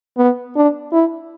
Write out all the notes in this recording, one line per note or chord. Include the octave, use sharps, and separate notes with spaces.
B3
D4
E4